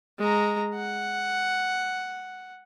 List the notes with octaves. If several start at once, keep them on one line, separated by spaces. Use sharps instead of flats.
G#3 A#5
F#5